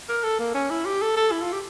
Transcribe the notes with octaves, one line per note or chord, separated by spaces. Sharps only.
A#4
A4
A#3
C#4
E4
G4
A4
A4
E4
F4
G4